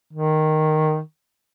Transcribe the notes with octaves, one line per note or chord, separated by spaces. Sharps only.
D#3